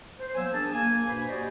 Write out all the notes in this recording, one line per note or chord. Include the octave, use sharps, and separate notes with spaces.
C5
F3 F#3 A#3 B3 G#5 E6
D4 G#4 A#4 G#5 A5
A#3 G#5
G2 B2 B4 C5 G#5 B5
F#4 G4 C5 D5 D#5